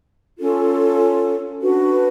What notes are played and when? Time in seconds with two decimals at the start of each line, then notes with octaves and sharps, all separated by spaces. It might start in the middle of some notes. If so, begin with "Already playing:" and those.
0.39 C#4 F4 A4
1.61 D4 F#4 B4